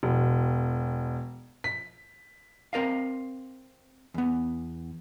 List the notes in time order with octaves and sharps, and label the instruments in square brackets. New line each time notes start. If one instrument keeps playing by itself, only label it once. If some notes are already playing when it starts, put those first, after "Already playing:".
[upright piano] E1
B6
[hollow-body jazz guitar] C4 A#4 D#5 F5
E2 B3